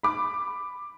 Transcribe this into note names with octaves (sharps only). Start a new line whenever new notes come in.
B5 D6